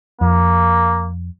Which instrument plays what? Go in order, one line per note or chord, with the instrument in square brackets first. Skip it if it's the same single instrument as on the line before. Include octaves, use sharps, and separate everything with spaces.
[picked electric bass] F2 [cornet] A#3